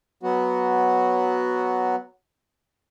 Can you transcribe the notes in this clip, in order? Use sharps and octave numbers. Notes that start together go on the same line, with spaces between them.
F#3 B3 F#4